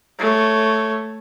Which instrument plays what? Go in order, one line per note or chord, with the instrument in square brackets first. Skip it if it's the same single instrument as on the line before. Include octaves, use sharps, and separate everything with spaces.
[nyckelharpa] A3 C#5